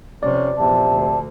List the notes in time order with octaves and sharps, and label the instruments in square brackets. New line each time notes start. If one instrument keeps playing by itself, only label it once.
[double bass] F2 C3 [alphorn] C#4 [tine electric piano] D5
[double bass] A#1 E2 [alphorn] C3 [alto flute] A5
[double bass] D2